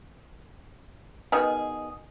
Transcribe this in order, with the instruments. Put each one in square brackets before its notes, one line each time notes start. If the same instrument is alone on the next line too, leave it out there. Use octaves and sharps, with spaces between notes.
[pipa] B2 D#3 G#4